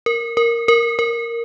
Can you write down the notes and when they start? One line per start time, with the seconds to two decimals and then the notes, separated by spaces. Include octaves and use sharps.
0.06 A#4
0.37 A#4
0.68 A#4
0.99 A#4